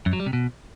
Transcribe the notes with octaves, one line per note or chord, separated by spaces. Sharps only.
F#2
F#3
G3
C3
B2